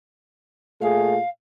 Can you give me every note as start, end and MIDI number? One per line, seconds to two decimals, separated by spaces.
0.81 1.17 46
0.81 1.17 57
0.81 1.17 68
0.81 1.29 77